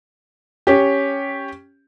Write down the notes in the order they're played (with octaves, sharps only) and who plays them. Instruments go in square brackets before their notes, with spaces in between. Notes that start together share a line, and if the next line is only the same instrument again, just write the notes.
[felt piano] C#4 G4